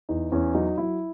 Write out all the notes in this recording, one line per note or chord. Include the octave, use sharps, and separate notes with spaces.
E2 D#4
E2 C#4
F#3 D#4
F#3 E4